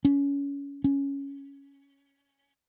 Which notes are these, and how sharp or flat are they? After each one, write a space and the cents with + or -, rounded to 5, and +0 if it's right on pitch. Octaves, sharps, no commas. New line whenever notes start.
C#4 +25
C#4 +5